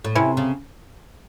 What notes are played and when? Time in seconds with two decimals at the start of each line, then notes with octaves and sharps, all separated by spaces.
0.04 A2
0.15 C3 C#4 E4
0.37 C#3